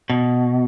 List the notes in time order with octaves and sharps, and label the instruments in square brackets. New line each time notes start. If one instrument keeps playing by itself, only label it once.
[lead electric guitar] B2